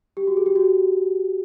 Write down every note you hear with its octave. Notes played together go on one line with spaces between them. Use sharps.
G4
F#4
G#4
G4
F#4